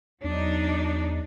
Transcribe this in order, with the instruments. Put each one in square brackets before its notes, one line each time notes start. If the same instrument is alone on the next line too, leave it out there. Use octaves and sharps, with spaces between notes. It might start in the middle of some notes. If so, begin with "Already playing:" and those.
[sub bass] E2 [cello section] F#3 D4 D#4